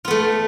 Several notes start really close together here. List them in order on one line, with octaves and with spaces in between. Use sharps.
F4 B3 A3